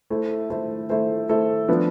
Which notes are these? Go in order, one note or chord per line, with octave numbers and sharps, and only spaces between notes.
A3 E4 A4 C5
A3 E4 A4 C5
A3 E4 A4 C5
A3 E4 A4 C5
F3 B3 D4